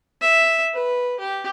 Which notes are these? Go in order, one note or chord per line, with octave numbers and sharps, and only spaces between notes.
E5
B4
G4